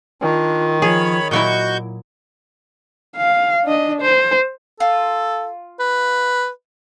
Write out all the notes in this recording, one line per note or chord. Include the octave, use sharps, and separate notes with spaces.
D#3 D4 F4
F3 G#4 C#5 B5
A#2 F#3 E4 F#4 D#5 C#6 G6
F5
D4 D#5
C5
F4 A4
B4